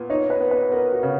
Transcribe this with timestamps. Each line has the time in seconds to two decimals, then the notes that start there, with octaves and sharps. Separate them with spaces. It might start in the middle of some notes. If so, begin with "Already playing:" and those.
Already playing: A#2 B3
0.10 D#4 C#5
0.30 B4
0.40 B3
0.51 B4
0.72 B3 A#4
0.93 F#4
1.03 C#3